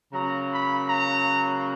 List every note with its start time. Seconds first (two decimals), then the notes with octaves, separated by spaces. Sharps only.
0.13 C#3 F#3 A#3 A#5
0.51 B5
0.89 A#5